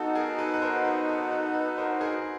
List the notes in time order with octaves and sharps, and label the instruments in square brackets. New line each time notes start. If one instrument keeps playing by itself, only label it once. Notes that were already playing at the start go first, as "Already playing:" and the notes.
Already playing: [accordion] B3 D#4 F#4 [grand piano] A4
[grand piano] G#4 A#4
A4 B4
B4
A#4 C5
A4 B4
A4
A4 B4
A4 B4
A#4 C5
G#4 A#4